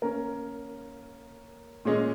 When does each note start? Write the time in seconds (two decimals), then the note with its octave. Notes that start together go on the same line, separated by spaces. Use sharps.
0.02 A#3 C#4 A#4
1.85 A#2 G#3 C#4 G#4 D#5